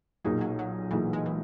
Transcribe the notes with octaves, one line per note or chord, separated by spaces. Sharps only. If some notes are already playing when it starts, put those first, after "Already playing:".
B1 A#2 F#3 A#3 D#4 G#4
F#3
F#3
B1 A#2 E3 A#3 D#4 G#4
G#3
E3